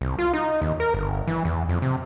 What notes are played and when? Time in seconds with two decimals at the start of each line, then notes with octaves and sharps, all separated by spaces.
0.01 C2
0.18 F4
0.33 D#4
0.61 D#2
0.80 A#4
0.94 G1
1.27 E3
1.45 E2
1.69 F2
1.82 C3